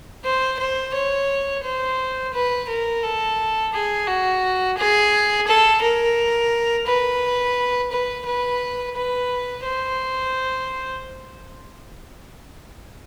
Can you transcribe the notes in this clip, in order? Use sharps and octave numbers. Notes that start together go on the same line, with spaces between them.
C5
C5
C#5
C5
B4
A#4
A4
G#4
F#4
G#4
A4
A#4
B4
B4
B4
B4
C5